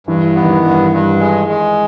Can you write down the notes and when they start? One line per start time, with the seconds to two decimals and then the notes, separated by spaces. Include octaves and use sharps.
0.07 G2 E3
0.35 B3
0.43 D#3
0.50 E3
0.64 G2
0.92 G2
1.20 G#3
1.48 G#3